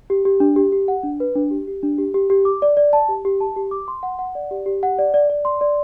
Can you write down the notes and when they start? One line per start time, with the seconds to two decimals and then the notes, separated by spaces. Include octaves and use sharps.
0.10 G4
0.25 G4
0.40 D4
0.56 G4
0.72 G4
0.88 F#5
1.03 D4
1.20 B4
1.35 D4
1.51 G4
1.68 G4
1.83 D4
1.98 G4
2.14 G4
2.30 G4
2.45 D6
2.62 D5
2.77 D5
2.93 A5
3.09 G4
3.25 G4
3.40 A5
3.56 G4
3.71 D6
3.88 C6
4.03 F#5
4.19 F#5
4.35 D5
4.51 G4
4.66 G4
4.83 F#5
4.99 D5
5.14 D5
5.30 D5
5.45 C6
5.61 D5